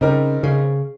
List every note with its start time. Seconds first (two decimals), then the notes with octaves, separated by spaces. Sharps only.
0.01 C#3 G3 C4 D#4 G4 A#4
0.43 C#3